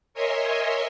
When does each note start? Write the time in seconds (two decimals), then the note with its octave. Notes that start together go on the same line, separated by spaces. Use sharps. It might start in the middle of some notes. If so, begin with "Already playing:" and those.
0.14 A#4 C#5 D#5 E5 G#5 C6